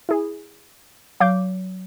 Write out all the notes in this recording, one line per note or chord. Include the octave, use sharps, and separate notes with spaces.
E4 G#4
F#3 F5 D6 G6